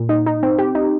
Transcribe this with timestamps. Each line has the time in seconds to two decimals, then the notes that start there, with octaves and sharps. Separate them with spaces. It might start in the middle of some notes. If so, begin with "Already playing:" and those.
Already playing: A#2
0.09 D#4
0.26 D#4
0.43 C4
0.59 G4
0.75 D#4